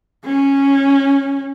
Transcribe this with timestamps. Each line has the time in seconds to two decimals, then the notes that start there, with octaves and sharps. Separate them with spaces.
0.24 C#4